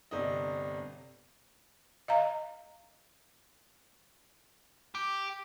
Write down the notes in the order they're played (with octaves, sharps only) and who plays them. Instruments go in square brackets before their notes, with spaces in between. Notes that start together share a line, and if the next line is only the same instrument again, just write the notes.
[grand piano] G1 C3 D4 D#5
[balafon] D#5 F5 A#5
[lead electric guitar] G4